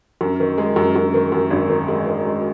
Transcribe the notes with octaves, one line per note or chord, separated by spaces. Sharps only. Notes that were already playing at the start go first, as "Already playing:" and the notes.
F#2
D#3
G#3
F#2
F#2
D#3
F#2
G#1
D#3
G#3
D#3
G#3